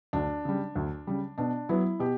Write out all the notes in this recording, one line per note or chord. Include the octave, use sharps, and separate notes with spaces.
D2 D4
C#3 G3
D2
C#3 G3
B2 D4
F#3 B3 E4
B2 G4